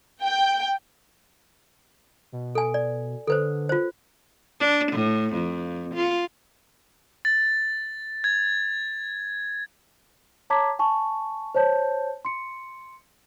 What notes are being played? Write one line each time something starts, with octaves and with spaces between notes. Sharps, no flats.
G5
B2
A4 G#5
D5
D3 A4 B4 C5
F4 C5
D4
A2
F2
F4
A6
G#6
C#5 A5 A#5 D6 G#6 B6
G#5 A5 C#6
C5 C#5 A5 G6
C6 C#7